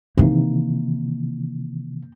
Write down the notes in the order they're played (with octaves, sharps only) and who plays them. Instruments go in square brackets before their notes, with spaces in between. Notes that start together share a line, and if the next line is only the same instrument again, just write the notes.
[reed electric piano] C3 D#3 E3 [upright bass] A#3 D#4